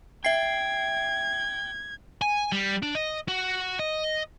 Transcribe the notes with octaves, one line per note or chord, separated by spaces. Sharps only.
E5 G5 G#6 C7
G#5
G3
D4
D#5
F#4
D#5